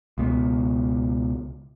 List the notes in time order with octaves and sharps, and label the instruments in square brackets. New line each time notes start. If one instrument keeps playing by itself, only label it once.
[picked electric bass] C#2 B2